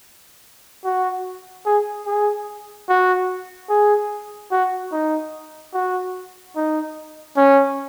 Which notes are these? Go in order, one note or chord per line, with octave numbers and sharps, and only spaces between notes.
F#4
G#4
G#4
F#4
G#4
F#4
D#4
F#4
D#4
C#4